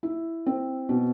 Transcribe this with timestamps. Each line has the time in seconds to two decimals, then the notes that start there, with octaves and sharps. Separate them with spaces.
0.03 E4
0.46 C4
0.89 B2